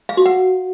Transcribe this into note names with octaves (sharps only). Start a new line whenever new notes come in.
F5
F#4
F#5